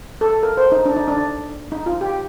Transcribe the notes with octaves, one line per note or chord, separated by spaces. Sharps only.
A4
A#4
C5
D#4
D4
D#4
D4
D#4
F4
G4